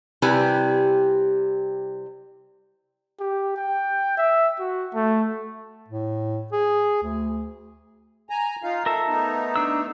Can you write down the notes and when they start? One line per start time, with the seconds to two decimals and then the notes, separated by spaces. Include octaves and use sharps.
0.22 C3 G3 E4 B4 G#5
3.20 G4
3.57 G5
4.17 E5
4.59 F#4
4.94 A3
5.89 A2
6.52 G#4
7.03 D2
8.30 G#5 A#5
8.63 D#4 F4 F5
8.86 A4 A#4 E5 A5
9.07 A3 B3 D#4
9.56 D4 E6